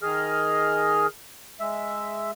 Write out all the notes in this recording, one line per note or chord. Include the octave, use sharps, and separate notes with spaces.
D#3 G#4 D#5 F6
G#3 E5